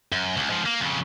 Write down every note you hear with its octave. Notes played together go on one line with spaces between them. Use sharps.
F#2
C#2
G#2 F3
A#3
F2 C#3